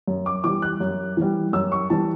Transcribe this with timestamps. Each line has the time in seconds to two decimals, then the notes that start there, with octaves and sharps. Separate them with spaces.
0.07 F#2
0.26 D6
0.44 E3 G3 D6
0.62 F#6
0.80 F#2
1.17 E3 G3
1.53 F#2 E6
1.72 C#6
1.90 E3 G3 A5